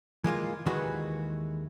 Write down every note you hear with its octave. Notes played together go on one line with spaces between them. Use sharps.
E3 G#3 A#3 F4
D#2 D#3 E3 G#3 F#4 B4